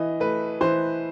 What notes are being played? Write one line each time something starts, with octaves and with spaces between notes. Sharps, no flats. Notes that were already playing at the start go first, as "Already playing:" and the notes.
Already playing: E3 D#5
A3 B4
E3 C5